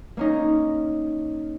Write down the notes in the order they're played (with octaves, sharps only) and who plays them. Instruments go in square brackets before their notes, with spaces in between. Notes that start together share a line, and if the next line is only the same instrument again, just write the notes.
[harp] A#3 C#4 D#4